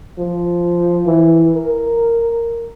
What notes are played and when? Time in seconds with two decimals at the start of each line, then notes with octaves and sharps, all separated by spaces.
0.18 F3
1.06 E3
1.56 A#4